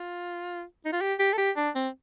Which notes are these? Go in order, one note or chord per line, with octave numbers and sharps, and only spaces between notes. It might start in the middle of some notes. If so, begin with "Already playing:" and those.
Already playing: F4
D#4
F4
G4
G4
A4
G4
D4
C4